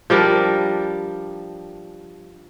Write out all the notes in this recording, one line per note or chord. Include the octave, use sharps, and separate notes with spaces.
F3 G3 D4 A#4